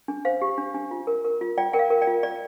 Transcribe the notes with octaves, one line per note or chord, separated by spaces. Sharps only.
D4
C5 F5
G4
D4
D4
F4
A#4
A#4
F4
F4 D5 G5
A#4 G5
F5
A#4
D5 G5
F4
F4 D5